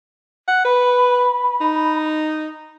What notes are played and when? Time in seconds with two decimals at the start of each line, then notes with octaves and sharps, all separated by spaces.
0.48 F#5
0.65 B4 B5
1.61 D#4